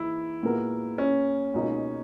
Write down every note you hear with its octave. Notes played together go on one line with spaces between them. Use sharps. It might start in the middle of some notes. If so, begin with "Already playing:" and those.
Already playing: G#2 E3 A#3 E4
A#2 G#3 B3 F#4 A#4
C#4
C#2 B2 A#3 D#4